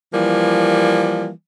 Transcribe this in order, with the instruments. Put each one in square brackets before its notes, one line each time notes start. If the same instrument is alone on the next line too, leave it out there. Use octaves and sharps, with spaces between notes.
[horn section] E3 F3 G3 A#3